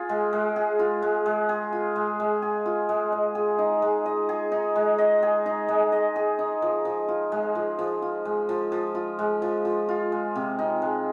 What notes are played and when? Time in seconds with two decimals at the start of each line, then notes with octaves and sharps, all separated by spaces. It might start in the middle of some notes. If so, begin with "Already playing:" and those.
Already playing: F4 G#4
0.09 G#3
0.33 G#3
0.56 G#4
0.79 F4
1.02 G#3
1.26 G#3
1.49 G#4
1.73 F4
1.96 G#3
2.20 G#3
2.42 G#4
2.66 F4
2.89 G#3
3.12 D#5
3.35 G#4
3.59 D#4
3.82 G#3
4.06 D#5
4.29 G#4
4.52 D#4
4.75 G#3
4.98 D#5
5.23 G#4
5.46 D#4
5.68 G#3
5.92 D#5
6.16 G#4
6.39 D#4
6.62 F3
6.85 F3
7.08 F4
7.32 G#3
7.55 F3
7.79 F3
8.02 F4
8.25 G#3
8.49 F3
8.72 F3
8.95 F4
9.19 G#3
9.42 F3
9.65 F3
9.89 F4
10.12 G#3
10.35 C3
10.59 D#4
10.82 G#3